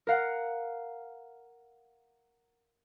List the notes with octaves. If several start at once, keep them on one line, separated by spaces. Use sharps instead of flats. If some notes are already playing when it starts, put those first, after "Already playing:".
A#4 F5 F#5